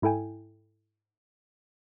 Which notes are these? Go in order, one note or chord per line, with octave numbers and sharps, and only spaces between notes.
G#2 E4 A4 G5 G#5